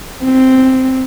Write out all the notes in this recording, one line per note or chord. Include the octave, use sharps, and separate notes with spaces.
C4